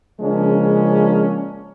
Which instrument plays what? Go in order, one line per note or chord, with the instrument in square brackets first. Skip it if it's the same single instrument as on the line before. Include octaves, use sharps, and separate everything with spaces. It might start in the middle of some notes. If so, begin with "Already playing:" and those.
[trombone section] C#3 F3 G#3 A#3 C#4 D4